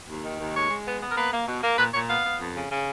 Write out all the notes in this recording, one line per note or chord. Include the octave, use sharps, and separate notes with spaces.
D#2
D#3
D#2
G#3 C#5
G#3
B3
B3
A#4
A#3 B4
A#3
B2
A#3
A#2 B4
A#2 C#5
B3 F5
B3
F2
C#3
C#3